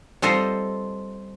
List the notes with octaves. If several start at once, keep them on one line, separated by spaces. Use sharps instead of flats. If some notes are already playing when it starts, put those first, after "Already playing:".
G3 C4 F4 A4 C5 D#5